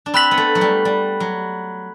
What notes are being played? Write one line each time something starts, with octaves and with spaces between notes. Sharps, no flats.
D4
C4 B5 F#6 B6 F#7
B3
A3
F#3
G3
G3
F#3